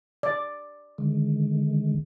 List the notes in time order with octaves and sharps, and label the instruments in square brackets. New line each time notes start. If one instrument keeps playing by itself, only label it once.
[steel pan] D5
[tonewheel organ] D3 D#3 G#3